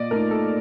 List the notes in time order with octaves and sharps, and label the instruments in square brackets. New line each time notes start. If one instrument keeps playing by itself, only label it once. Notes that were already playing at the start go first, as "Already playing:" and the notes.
Already playing: [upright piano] A#2 [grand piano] D5 D#5
[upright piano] A3 D#4 [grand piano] A#4
[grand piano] A4